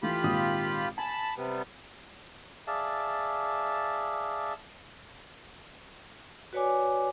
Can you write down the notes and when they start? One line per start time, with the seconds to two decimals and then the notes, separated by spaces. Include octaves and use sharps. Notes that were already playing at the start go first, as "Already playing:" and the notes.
0.03 E3 A3 F4 G4 B5
0.23 G#1 A#2 D#6
0.98 G#5 A5 B5
1.37 C3 G3 B3
2.67 G#4 D5 E5 F5 A5
6.53 F#4 B4 C#5 D5 G#5 D6